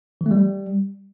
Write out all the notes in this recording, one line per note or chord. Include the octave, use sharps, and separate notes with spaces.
E3
A3
G3